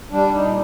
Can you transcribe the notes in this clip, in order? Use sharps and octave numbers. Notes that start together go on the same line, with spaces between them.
G3 D4
D#4
A#2